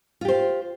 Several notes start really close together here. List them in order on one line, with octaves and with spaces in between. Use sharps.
F4 G4 C5